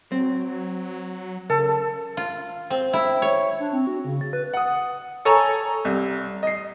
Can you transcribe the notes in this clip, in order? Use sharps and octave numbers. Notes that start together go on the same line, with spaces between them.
F#3 C4
C#3 A4 A#4
F4
C4
E4
C#5
D4
C4
F#4
C#3
A6
B4
F#5 D#6
A4 C#5 G#5 A#5 C#6
C2
D#5 C7